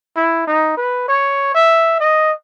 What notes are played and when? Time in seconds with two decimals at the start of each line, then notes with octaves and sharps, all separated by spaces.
0.16 E4
0.47 D#4
0.77 B4
1.08 C#5
1.54 E5
2.00 D#5